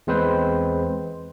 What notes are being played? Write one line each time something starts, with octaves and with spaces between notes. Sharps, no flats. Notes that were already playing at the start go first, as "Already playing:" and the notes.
E2 G#3 C4 B4 C5